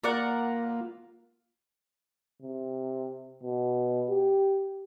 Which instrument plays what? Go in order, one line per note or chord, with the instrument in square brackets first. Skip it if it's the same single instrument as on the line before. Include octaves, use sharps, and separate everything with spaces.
[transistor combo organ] A#3 F4 [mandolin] A#4 D5 F#5
[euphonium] C3
B2
G4